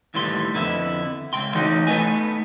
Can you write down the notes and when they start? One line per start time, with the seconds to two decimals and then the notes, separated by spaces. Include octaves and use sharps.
0.14 D#2 A2 E3 G3 C6
0.54 F2 D3 B3 E4
1.33 C#2 G5 C6
1.54 E3 A3 C#4 D#4 F#4
1.87 A3 B3 D#4 B4 G#5